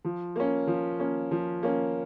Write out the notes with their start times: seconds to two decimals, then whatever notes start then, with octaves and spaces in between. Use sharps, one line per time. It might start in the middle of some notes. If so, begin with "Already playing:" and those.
0.05 F3
0.36 A#3 C#4
0.67 F3
1.00 A#3 C#4
1.31 F3
1.63 A#3 C#4